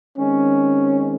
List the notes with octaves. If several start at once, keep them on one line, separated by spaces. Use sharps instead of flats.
D#3 G#3 C4 C#4